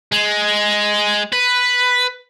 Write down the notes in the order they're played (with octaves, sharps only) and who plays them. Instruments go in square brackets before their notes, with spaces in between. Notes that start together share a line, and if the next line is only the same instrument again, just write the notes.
[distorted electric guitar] G#3
B4